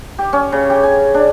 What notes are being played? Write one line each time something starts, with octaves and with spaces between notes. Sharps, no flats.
G4
C#4
C#3
G4
G#5
D4